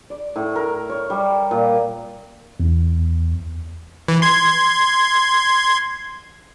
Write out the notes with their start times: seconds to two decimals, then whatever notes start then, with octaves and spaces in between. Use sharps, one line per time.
0.10 D5
0.36 A2
0.56 A#4
0.90 C#5
1.10 G3
1.51 A#2
2.60 E2
4.08 E3
4.22 C6 G#6